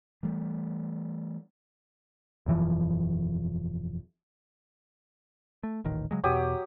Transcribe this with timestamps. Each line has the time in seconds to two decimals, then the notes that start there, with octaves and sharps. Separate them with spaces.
0.23 E3 G3 A3
2.46 E1 F#2 E3 F3
5.63 A3
5.85 D#1 A1 D#3
6.11 C#3 F#3 G#3
6.24 E2 B2 F#3 G4 D#6